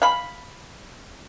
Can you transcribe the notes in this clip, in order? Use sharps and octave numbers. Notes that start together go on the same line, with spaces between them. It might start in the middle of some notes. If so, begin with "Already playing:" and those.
F5 B5